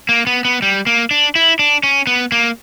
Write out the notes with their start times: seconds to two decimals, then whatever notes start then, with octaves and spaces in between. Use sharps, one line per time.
0.09 A#3
0.27 B3
0.45 B3
0.62 G3
0.87 A#3
1.11 D4
1.35 E4
1.59 D4
1.84 C#4
2.07 B3
2.32 A#3